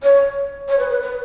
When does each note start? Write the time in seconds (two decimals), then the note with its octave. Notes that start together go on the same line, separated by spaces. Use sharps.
0.03 C#5
0.69 C#5
0.79 B4
0.90 B4
1.02 B4